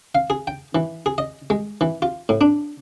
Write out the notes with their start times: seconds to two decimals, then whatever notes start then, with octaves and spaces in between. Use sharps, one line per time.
0.15 F5
0.30 G#4
0.47 G5
0.75 E3
1.06 G#4
1.18 D#5
1.50 G#3
1.81 E3
2.02 F4
2.29 A2
2.41 D4